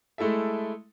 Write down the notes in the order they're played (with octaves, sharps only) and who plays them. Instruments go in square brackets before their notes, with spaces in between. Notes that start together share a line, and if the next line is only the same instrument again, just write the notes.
[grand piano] G#3 A3 E4 A4 E5